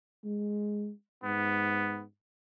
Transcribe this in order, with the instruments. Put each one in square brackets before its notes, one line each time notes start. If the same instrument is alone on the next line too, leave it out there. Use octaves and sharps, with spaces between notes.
[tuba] G#3
[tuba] G#2 [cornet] B3